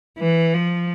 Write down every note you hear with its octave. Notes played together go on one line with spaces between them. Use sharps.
E3
F3